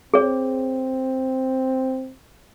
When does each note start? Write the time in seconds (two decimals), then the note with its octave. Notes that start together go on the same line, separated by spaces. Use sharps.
0.14 C4 G#4 C#5